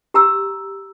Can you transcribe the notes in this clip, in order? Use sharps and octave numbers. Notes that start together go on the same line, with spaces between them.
G4 A#5 E6